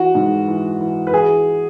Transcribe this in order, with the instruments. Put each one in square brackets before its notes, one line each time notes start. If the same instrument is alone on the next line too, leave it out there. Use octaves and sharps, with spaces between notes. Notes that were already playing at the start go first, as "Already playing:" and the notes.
Already playing: [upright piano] E3 F#4
G#2
E3
E3
B4
E3 G#4